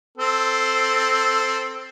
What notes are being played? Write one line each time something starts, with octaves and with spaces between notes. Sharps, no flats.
C4 A4